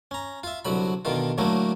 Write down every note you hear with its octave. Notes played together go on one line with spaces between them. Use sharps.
C#4 A#5
F4 E5
C2 D3 F#3 B5
B2 D3 D#3 F4
A2 D3 F#3 A3 A#3